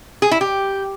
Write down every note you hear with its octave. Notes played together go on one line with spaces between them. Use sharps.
G#4
E4
G4